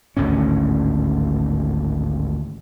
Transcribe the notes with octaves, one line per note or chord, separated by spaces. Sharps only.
G#1 D2 A2 C#4